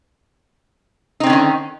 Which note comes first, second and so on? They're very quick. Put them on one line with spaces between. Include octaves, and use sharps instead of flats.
D#4 C4 D3 C#4 D#3